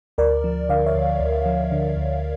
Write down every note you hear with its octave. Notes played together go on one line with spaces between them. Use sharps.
D2 A#4 D5
F3
D3 D5 F5
C#5 E5
D2
D2
F3
D3
D2